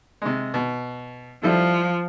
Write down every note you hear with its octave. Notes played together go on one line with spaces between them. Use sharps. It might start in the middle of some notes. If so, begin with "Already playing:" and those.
C3 G#3
B2
F3 G3 E4 A4